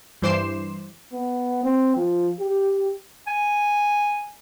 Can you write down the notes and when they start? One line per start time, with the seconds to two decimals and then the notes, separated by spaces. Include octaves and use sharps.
0.22 G2 E3 C5 D6 C7 E7
1.13 B3
1.64 C4
1.96 F3
2.40 G4
3.27 G#5